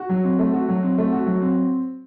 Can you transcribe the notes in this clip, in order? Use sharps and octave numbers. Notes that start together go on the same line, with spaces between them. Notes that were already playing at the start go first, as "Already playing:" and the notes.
Already playing: F#4
F#3
C4
A3
F#4
F#3
C4
A3
F#4
F#3
C4